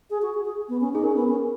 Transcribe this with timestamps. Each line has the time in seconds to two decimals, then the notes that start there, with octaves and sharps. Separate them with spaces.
0.10 G#4
0.21 F#4
0.33 G#4
0.45 G#4
0.68 B3
0.80 C#4
0.92 D#4 G#4
1.03 C#4 A#4
1.15 B3
1.27 C#4 G#4